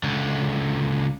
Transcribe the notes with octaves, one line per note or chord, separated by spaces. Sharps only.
C#2 D3